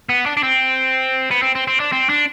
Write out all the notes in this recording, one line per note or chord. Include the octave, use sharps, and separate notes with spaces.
B3
D4
D4
C4
B3
C4
C4
C4
D4
C4
D4